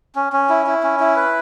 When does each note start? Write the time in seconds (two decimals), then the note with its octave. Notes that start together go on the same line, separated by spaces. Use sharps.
0.15 C#4
0.33 C#4
0.49 E4
0.67 E4
0.83 C#4
1.00 E4
1.16 B4